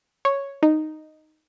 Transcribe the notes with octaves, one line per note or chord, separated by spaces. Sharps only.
C#5
D#4